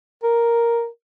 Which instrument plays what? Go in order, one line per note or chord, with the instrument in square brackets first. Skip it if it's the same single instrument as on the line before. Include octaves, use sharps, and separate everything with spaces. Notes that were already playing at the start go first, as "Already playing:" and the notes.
[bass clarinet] A#4